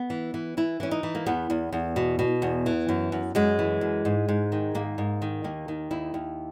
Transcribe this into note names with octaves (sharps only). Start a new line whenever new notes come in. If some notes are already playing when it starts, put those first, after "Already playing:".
Already playing: B3
E3
E3
E3 E4
E3 C#4
D#4
E3
A#3
E2 B3
E2
E2
B2
B2
E2
E3
F#2
F#2
F#2 G#3
E3
F#2
G#2
G#2
D#3
G#2 A#3
G#2
D#3
D#2 A#3
D#3
D#2 E4
D#2